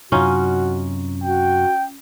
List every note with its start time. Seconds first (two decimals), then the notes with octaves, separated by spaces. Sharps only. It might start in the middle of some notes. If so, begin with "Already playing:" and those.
0.12 F#2 C3 C#4 D#4 F4 F#4
1.24 F#4 G5